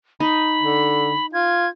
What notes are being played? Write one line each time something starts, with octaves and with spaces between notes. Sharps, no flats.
D#4 B5
D3
F4 G#6